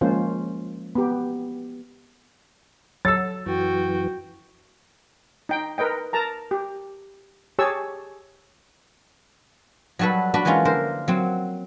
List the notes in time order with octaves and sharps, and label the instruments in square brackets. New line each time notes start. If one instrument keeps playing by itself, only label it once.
[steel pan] F3 G#3 A#3 C#4 F4 C5
B3 G4
[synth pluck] F#3 A4 [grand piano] E6 A6
[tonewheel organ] F#2 E3 [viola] F#4 G5
[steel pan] D#4 G5
A#4 B4 D#5 G5
A#4 A5 A#5
G4
G4 G#4 C#5 A5 C#6 E6
[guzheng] F#3 G3 F#4 A4 B4
D4 F#4 B4
E3 G#3 A#3 C#4 F4
D3 A#4 C5
F#3 C4